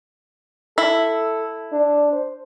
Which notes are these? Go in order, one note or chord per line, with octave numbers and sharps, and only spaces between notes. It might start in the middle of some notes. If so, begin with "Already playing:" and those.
E4 A4
D4
C5